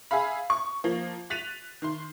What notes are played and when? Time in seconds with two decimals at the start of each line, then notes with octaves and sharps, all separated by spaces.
0.11 G#4 E5 F5 B5
0.50 C#6
0.84 F3 A#3
1.30 F#6 A6 B6 D#7 F7
1.82 D#3 C6